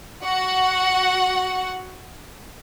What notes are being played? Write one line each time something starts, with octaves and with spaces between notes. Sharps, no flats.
F#4 F#5